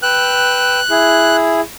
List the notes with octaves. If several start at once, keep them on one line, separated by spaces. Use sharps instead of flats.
B4 G5 E6 F#6
E4 G#4